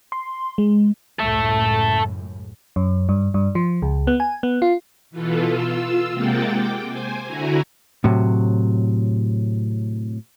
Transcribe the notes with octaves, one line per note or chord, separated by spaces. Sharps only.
C6
G#3
C#2 F#2 A2 A4 E5
F#2
G2
G2
F3
C#2
B3
G#5
B3
F4
B2 E3 B3 F4 A4
F4 E6
C3 G#3 A#3 F#5 G5 A6
G5 D6
C5 G#5
D3 E4 F#4 G#5 A#5
A2 C3 F#3